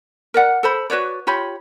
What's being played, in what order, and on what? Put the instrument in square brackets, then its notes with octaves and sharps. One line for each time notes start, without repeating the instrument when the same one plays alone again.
[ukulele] A#4 D5 F#5
A4 C5 B5
F#4 B4 C#5 D5
F4 G4 C#5 B5